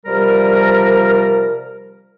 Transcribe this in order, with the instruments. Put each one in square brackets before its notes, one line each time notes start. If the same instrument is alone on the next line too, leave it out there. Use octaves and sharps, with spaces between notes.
[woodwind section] C3 F3 G3 A#4